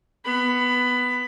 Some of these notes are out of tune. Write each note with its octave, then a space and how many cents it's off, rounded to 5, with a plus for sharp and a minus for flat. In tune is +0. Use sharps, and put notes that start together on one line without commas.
B3 +0 B5 +20